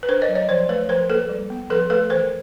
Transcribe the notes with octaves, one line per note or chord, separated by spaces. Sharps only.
B4
D4 A#4 C5
C#5 D#5
F#3
C#5 D#5
F3 C5 D5
A3 B4 C#5
F3 A#4 C5
A#3 A4 B4
G3
B3
F3 A4 B4
A3 A4 B4
E3 A#4 C5